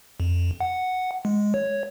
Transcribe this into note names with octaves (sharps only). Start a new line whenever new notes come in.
F2
F#5
G#3
C#5